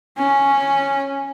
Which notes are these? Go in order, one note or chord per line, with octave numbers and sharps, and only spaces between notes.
C#4